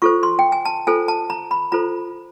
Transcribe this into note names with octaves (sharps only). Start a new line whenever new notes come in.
F4 A4 C5 C#6
C6
G5
G#5
A5
F4 A4 C5 G#5
A5
A#5
B5
F4 A4 C5 A#5